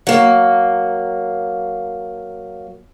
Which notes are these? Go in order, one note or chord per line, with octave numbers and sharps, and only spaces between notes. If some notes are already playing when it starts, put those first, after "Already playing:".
F#3 A#3